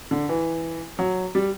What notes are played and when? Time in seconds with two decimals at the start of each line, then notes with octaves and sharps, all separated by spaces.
0.11 D3
0.29 E3
0.99 F#3
1.35 G3